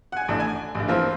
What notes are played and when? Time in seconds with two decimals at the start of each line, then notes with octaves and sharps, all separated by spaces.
0.12 F#5 G#5
0.28 A1 A2 D4
0.40 G#5
0.75 A1 G2
0.88 E3 F3 A#3 C4 F4